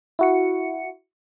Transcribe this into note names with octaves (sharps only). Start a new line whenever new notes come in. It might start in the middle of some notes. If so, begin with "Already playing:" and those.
E4 F#4 C#7